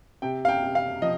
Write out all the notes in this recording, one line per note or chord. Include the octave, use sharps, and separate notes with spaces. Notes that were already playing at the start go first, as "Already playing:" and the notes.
C3 G5
F5
G5
C3
F5
F3 D#5